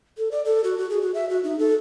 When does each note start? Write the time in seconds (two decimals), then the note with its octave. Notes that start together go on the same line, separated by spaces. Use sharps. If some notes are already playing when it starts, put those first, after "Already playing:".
0.18 A4
0.31 D5
0.45 A4
0.64 F#4
0.78 F#4
0.90 G#4
1.02 F#4
1.14 E5
1.30 F#4
1.44 D#4
1.59 A4